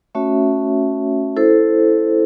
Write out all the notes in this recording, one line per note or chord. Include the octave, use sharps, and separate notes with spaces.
A3 C#4 F#4 C#5 E5
E4 A4 C5